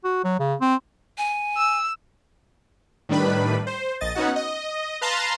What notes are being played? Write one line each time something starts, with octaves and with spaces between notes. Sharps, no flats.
F#4
F#3
C#3
C4
G#5
E6
A2 D#3 G3 D4 B4 B5
C5
A#1 D#5 A6
B3 C#4 D#4 F#4 F#5
D#5
B4 F5 A5 A#5 C6